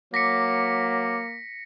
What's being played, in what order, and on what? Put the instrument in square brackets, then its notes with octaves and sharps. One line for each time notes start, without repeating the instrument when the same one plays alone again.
[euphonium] F#3 [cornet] A#3 [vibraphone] D6 [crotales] A#6 B6 C#7